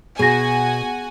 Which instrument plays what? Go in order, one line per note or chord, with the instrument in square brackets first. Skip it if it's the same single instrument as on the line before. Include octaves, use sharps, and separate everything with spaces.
[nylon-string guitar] B2 [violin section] F#4 G#5 [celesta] G#4 A#6